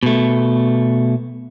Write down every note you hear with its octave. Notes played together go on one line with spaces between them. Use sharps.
B2 A3